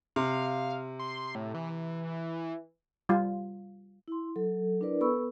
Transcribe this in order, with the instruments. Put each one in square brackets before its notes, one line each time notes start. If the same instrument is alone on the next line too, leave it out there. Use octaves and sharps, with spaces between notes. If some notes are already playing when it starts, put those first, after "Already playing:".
[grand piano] C3 [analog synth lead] F5
[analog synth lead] C6
A2
E3
[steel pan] G3 F4
[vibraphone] E4 C6
F#3 A4
D4 E4 A#4 B4 D5
B3 A4 B4 B5 C#6 E6